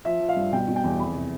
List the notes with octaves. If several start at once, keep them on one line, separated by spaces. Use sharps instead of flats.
F3 E5
F3
F5
G2
B2 G5
B2
G5
E2
F2 B5
C3